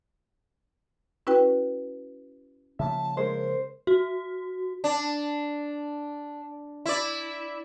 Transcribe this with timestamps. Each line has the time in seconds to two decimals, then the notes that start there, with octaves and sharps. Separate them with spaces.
1.27 C#4 E4 F#4 B4 G5
2.79 C#3 F3 A#3 E5 A5
3.17 G#3 A#4 C5
3.87 F#4
4.84 D4
6.86 E4 D5